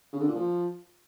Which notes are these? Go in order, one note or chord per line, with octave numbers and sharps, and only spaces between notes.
C#3
D3
A#2
F3